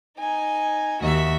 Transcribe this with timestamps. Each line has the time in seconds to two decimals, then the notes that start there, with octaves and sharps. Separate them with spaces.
0.18 D#4 G#5
1.01 D#2 F#4 E5